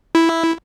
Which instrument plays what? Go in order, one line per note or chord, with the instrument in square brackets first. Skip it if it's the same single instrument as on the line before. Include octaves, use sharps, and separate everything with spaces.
[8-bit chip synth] E4